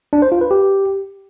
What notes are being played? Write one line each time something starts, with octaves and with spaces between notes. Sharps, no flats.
D4
C5
F4
B4
G4